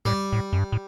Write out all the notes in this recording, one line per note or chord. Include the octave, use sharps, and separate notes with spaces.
A2 G3
A2
F#2
G2
A2